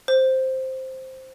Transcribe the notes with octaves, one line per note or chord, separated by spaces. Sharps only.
C5